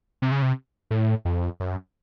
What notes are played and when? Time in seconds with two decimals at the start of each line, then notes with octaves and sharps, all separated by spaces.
0.22 C3
0.32 C#3
0.42 C3
0.91 A2
1.25 F2
1.60 F#2